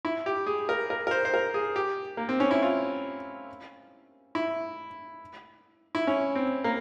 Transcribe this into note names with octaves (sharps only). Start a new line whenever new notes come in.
E4
G4
G#4
A#4
A#4
A#4
C5
C5
A#4
G#4
G4
A#3
C4
C#4
E4
F4
E4
E4
C#4
C4
A#3